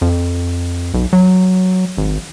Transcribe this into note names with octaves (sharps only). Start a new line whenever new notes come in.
F2
B1
F#3
G#1